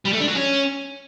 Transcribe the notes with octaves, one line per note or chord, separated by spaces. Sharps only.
G3
A3
D4
F#3
C#4